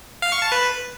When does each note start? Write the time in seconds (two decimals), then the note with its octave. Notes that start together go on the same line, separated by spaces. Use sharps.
0.22 F5
0.32 C#6
0.42 A5
0.52 B4